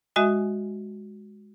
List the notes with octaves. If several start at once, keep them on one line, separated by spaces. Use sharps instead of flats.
G#3 F#4 D#5 E5 G#5 D#6